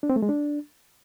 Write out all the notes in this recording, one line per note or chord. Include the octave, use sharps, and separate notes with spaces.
D4
C4
A3
G#3
D4